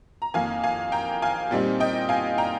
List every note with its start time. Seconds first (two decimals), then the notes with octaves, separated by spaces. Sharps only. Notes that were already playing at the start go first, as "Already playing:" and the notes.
0.22 A#5
0.34 F2 D#3 A#3 F5 G#5
0.63 F5 G#5
0.92 G5 A#5
1.22 F5 G#5
1.51 A#2 G3 C4 D#4
1.80 D#5 G5
2.09 F5 G#5
2.38 G5 A#5